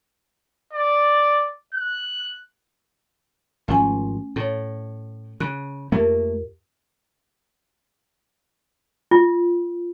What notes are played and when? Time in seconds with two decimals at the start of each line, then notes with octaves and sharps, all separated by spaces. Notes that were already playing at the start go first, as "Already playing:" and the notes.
0.73 D5
1.74 F#6
3.68 G#1 F3 A3 C#4 G#5
4.36 A2 A4 C#5
5.40 C#3 F#6
5.92 F2 A3 A#3 G4 A#4
9.11 F4